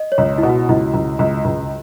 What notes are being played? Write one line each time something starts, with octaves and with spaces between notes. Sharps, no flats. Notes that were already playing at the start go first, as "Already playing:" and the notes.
Already playing: D#5
C#5
C#2
B2 E4
F#4
C#2 E4
C#2
C#2
C#2